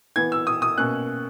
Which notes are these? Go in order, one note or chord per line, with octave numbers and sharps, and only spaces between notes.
E3 B3 G#6
E6
D#6
D#6
B2 A#3 C#4 F#6